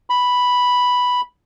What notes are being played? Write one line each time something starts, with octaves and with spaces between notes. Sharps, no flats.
B5